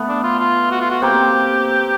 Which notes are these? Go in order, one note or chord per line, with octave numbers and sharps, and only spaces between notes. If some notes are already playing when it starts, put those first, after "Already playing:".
Already playing: A3 B3
D4
F4
F4
F#4
F4
F#4
A#3 C4 G4